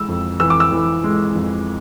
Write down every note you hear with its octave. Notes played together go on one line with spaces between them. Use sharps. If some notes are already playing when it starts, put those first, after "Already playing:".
Already playing: E3 G#3 E6
F2
E3 E6
D6
E6
E3
G#3
F2